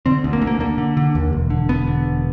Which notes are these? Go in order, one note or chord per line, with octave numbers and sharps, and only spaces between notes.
D3 C4
D2
A#3
D2
A#3
D3 A#3
D3
D3
D#2
E1
D3
E1 B3
D3
E1